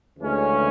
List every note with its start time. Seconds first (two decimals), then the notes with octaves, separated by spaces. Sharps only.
0.18 D2 C#3 E3 G#3 C#4